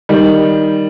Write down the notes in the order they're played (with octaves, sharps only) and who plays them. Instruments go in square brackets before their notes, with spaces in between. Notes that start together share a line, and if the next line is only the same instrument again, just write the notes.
[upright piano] D#3 G3